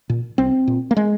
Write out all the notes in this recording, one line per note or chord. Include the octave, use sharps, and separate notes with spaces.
A#2
C2 C4
A#2
A#3
G#3